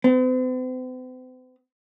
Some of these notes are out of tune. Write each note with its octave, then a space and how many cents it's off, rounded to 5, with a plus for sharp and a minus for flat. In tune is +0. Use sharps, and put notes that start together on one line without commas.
C4 -45